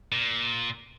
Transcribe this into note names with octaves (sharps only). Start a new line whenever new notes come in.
A#2